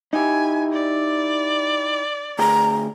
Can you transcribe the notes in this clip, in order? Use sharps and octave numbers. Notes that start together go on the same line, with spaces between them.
D#4 E4 G4 G#5
D5
D2 G#4 G5 A#5